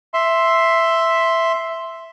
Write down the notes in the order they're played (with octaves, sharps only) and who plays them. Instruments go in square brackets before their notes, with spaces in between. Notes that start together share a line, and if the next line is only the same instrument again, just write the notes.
[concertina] E5 C6